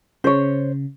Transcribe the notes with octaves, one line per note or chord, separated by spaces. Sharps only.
C#3 C5 C#5